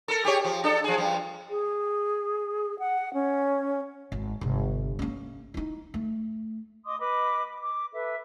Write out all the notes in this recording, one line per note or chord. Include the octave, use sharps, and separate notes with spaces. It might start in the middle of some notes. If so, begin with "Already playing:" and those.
A4 A#4
G4 G#4 C#5
F3
D4 A4
F3 G#4
G2 F3
G#4
F#5
C#4
G#1
G1 C3
A#3 C#4
D#4 E4
A3
D#5 C6 D6 D#6
B4 D#5 B5 D6
D6
A4 B4 E5